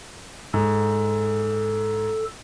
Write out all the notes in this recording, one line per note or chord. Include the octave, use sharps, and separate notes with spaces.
G#2 A4